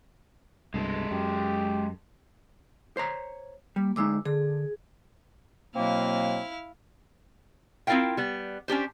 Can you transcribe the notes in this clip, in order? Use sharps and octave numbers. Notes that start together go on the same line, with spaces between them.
C2 G2 B2 G#3 A4
F#2 G4
C5 C#5 A#5
G3 A#3
D2 G#3 D#4 D6 E6
D3 G#4
B2 F#3 A#3 C4 E4 F5
C4 E4 F4 A#4 F5 G5
G3 B3
C#4 D4 G4 C5